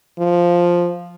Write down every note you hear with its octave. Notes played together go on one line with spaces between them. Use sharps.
F3